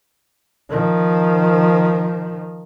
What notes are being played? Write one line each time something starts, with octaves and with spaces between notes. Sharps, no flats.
D#3 F3